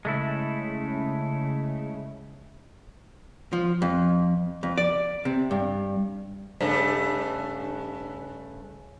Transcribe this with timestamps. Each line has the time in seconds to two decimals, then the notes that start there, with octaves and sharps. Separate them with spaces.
0.05 C#3 G#3 A3 E4
3.53 F3
3.82 F2
4.63 F2
4.78 D5
5.25 C3
5.51 G2
6.61 G2 C#3 A3